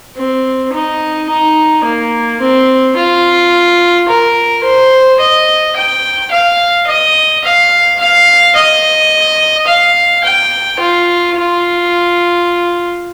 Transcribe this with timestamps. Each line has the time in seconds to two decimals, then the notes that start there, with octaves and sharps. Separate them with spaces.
0.16 C4
0.73 D#4
1.29 D#4
1.84 A#3
2.40 C4
2.97 F4
4.08 A#4
4.64 C5
5.20 D#5
5.76 G5
6.31 F5
6.87 D#5
7.43 F5
7.99 F5
8.55 D#5
9.67 F5
10.23 G5
10.79 F4
11.36 F4